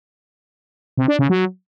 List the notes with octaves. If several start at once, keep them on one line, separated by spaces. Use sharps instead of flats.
C3
D4
C#3
F#3